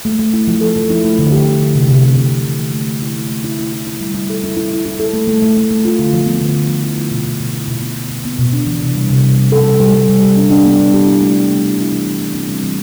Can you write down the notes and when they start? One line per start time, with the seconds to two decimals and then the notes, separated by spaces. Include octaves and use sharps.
0.05 A3
0.19 A3
0.34 E4
0.48 F3
0.61 A4
0.76 F3
0.90 E4
1.04 A3
1.19 D3
1.32 G4
1.46 E4
1.60 D3
1.75 C3
1.89 C3
2.03 C3
2.17 C3
2.31 E3
2.45 E3
2.60 A3
2.74 A3
2.88 A3
3.02 E4
3.15 A3
3.30 A3
3.44 E4
3.59 E4
3.73 E4
3.87 E4
4.00 G3
4.14 E4
4.30 A4
4.44 E4
4.57 E4
4.71 E4
4.85 E4
5.00 A4
5.14 A3
5.28 A3
5.42 A3
5.57 A3
5.71 A3
5.85 F4
5.99 D3
6.13 F3
6.26 B3
6.41 D3
6.56 F3
6.69 F3
6.83 E4
6.98 A3
7.11 B2
7.26 B2
7.40 B2
7.54 E4
7.68 B2
7.82 B3
7.96 B3
8.11 B2
8.25 B3
8.39 B2
8.53 D4
8.67 E3
8.81 C3
8.95 G3
9.10 C3
9.24 G3
9.38 G3
9.52 A4
9.66 G3
9.80 G3
9.94 G3
10.09 G3
10.22 G4
10.37 D4
10.51 D4
10.65 B3
10.79 G3
10.94 G4
11.07 E4
11.21 A3
11.36 A3
11.50 A3
11.65 E4
11.78 E4
11.92 E3
12.06 E3
12.21 E3
12.34 C4
12.49 G3
12.63 E3